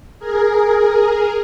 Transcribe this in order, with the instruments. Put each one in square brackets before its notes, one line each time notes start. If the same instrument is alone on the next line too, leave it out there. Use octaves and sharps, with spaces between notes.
[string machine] G#4 A#4